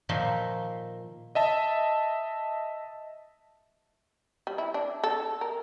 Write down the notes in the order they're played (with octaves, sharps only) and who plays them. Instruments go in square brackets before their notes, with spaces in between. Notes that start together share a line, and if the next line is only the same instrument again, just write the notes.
[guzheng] A#2 D#3 F3 D#4 E5 C6
[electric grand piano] D#5 E5 A5
[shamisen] G3
E4
D4
A4
A#4